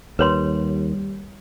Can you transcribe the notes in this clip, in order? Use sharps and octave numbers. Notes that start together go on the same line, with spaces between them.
D#2 G3 B4 C#5 C6